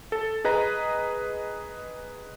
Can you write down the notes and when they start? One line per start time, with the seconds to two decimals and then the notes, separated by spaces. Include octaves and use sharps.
0.12 A4
0.45 G#4 B4 D#5 A#5